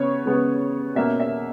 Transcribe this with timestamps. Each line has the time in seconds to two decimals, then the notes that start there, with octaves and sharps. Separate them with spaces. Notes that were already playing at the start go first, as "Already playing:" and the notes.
Already playing: C#3 B3 C#5
0.26 C#3 G#3 B3
0.95 B2 A#3 C#4 E5
1.20 E5